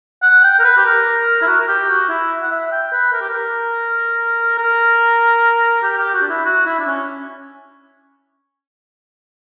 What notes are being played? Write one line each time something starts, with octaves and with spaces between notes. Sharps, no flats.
F#5
G5
A#4
B4
G4
A#4
E4
F#4
A#4
G4
F#4
E4
F#5
E5
G5
B4
A#4
G4
A#4
A#4
G4
G4
F#4
D4
E4
F#4
E4
D4
C#4